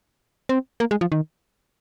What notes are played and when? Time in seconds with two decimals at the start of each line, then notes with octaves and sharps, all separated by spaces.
0.49 C4
0.80 A#3
0.91 G#3
1.01 F3
1.12 D#3